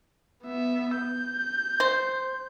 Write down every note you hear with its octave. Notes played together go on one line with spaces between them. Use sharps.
B3 E5
G6
C5